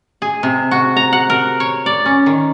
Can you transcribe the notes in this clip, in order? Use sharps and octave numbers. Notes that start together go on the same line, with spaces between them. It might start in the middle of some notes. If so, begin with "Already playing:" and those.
G#4
C3
F#4
A#5
F#5
A#4
C#5
D5
C#4
D#3